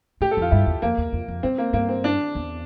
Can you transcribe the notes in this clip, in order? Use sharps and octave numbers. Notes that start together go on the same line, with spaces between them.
A2 G4
A4
F2 F4
G2 E4
E2
F2 A#3
E2
F2
F2
G2 C4
A#3
G2 A#3
C4
D4
E2